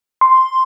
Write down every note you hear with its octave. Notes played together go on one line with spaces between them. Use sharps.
C6